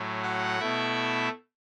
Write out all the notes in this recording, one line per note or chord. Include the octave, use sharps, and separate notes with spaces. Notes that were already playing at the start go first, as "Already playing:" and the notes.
Already playing: A2 F#3 A3
F#4 F#5
B2 A3 E4 E5